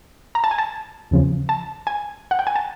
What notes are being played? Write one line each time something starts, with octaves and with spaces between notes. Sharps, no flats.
A#5
A5
G#5
A5
E2 C#3 F3
A5
G#5
F#5
G5
G#5
A5